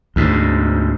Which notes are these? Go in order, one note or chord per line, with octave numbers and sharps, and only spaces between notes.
D2 G#2